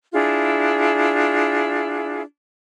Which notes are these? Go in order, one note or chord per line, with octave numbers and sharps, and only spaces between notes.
D4 E4 F4 G#4